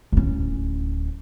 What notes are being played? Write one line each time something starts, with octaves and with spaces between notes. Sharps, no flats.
D1 C#4